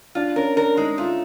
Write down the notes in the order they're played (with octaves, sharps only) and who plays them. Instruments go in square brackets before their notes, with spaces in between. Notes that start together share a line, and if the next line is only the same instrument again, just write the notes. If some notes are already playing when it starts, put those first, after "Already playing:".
[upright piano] D4 [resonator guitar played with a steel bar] F4
[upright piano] C#4 [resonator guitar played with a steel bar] A#4
[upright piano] D4 [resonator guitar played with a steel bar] A#4
[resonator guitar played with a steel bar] G#3 [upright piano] D#4
[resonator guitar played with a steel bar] A3 [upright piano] F4